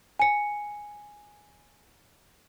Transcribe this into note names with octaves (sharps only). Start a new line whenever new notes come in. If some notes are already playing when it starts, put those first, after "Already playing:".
G#5 C#7